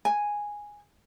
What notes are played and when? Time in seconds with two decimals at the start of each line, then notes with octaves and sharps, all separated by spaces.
0.05 G#5